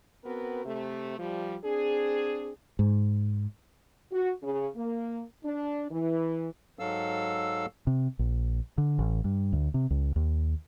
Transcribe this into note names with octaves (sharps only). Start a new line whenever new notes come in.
B3 C4 F#4 A#4 B4
C3 A3
F3 G3
C4 D4 G#4
G#2
F#4
C#3
A#3
D4
E3
G#2 F#3 A4 F5 E6
C3
A#1
D3
A1
G2
D2
C3
C#2
D#2